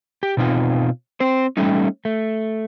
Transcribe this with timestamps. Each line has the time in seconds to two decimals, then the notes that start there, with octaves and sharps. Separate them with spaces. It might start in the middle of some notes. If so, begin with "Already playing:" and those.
0.23 G4
0.37 B2 C4 D#4 F4
1.20 C4 C5
1.57 G3 A3 C#4 D#4
2.05 A3